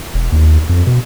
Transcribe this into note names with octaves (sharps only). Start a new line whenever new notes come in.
E1
D#2
F2
B2